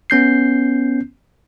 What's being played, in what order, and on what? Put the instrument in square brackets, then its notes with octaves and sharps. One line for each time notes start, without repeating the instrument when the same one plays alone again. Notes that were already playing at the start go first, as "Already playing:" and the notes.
[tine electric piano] B3 C#4 G6 C7